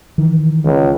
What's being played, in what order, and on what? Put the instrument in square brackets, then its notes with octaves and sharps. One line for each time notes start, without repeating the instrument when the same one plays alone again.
[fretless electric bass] D#3 E3
[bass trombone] C#2